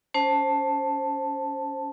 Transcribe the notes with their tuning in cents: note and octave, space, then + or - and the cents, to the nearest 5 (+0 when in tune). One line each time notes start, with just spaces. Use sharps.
C#4 +15 C5 +15 A5 +0